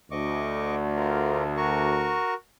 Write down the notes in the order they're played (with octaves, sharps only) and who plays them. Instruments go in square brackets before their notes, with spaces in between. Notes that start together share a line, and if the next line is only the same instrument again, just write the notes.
[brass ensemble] D2 [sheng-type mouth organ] D#5 C#6 D6
[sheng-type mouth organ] F4 A#4
F#4 A#4 C#6